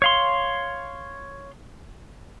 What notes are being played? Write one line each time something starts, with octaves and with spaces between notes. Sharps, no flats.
C#5 F5 C6